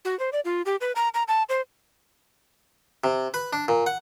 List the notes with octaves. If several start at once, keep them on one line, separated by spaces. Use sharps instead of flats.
F#4
C5
D5
F4
G4
B4
A#5
A#5
A5
C5
C3
B4
D4
A#2
F#5